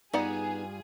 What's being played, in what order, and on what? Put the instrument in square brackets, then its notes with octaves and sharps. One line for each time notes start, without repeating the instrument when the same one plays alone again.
[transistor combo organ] G2 G3 F4 [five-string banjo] B3 D5 F#5 [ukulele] D#4 [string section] G#4